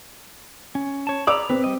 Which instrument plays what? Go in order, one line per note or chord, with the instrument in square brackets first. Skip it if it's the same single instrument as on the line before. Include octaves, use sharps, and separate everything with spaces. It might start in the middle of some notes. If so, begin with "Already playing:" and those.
[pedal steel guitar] C#4
C#5 A5
[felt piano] D5 D6 E6 [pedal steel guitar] A#5 B5
[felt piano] C4 [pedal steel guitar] B4
[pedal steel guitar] G3 D#5